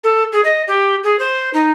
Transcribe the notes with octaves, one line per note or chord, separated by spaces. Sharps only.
A4
G#4
D#5
G4
G#4
C5
D#4